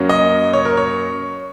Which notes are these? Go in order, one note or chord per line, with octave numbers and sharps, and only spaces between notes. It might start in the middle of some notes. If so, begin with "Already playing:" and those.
Already playing: F#2 F#3 A#3 C#4
D#5
C#5
A#4
C#5